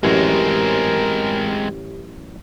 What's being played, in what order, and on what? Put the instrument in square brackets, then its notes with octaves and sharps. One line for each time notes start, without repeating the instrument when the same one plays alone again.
[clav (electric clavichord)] A1 F#2 C#5 [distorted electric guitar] G#3 C4 [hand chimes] G4 [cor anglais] A#4